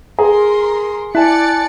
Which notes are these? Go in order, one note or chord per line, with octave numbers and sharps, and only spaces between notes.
G#4 A#4 A#5 C6
E4 D5 G#5 A5 F#6 A6 C#7